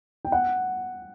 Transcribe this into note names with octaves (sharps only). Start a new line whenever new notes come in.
G5
F#5